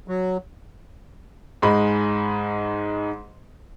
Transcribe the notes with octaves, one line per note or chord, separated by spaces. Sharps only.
F#3
G#2 G#3 D#4 B5